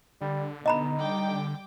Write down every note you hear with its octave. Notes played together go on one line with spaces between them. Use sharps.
D3 G3
B2 D#4 D#5 A#5 B5
G3 G5 D6